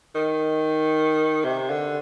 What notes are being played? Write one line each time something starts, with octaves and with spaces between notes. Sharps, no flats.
D#3
C3
D3